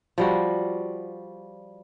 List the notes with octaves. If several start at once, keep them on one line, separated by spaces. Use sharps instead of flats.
F3 G3 F#4